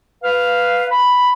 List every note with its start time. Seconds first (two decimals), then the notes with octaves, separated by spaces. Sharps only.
0.24 B4 F5
0.91 B5